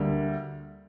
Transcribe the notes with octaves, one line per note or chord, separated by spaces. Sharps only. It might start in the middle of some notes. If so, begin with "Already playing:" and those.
Already playing: D2 D3 G3 A#3